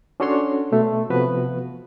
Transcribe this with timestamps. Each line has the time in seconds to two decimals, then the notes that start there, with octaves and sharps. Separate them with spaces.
0.20 C#4 D4 F#4 A4 C#5 C6
0.72 B2 A3
1.10 C3 F3 B3 F#4 B4